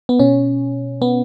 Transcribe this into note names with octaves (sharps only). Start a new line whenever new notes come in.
B3
B2 C#4
B3